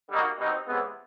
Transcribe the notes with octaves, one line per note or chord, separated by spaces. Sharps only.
D3 G3 A#3 D#4 F#4
B2 G3 C4 D#4
C#2 C3 E3 G#3 B3